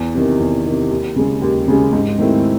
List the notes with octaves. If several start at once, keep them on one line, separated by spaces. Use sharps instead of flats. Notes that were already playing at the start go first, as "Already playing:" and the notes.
Already playing: E2
C3 D#3
E2
C3 D#3
D#2
C#3 G#3
D#2
C#3 G#3
G#2
D#3 A3 C4 E4